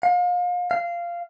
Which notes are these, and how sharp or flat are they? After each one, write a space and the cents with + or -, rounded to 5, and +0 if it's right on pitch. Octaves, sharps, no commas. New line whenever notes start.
F5 +35
F5 -15